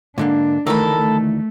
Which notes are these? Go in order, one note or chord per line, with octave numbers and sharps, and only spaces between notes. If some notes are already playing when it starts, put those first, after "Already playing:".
G#2 D3 A#3 D4
D2 D#3 E3 A3 A4 A#4 B5
A3